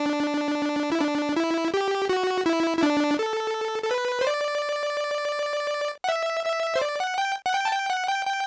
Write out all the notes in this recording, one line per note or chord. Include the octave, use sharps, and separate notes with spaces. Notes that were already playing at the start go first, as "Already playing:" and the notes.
Already playing: D4
E4
D4
E4
G4
F#4
E4
E4
D4
A4
A4
B4
C5
D5
F#5
E5
E5
C5
D5
F#5
G5
F#5
G5
A5
G5
F#5
G5
G5